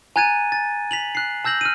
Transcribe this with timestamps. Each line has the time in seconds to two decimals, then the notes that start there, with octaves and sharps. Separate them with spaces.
0.16 G#5 A#5 F#6 G#6 A6 D#7
0.52 A6
0.91 B6 F7 F#7
1.15 F#6 C7
1.44 A5 E6 G6 A#6 F#7
1.61 F6 D#7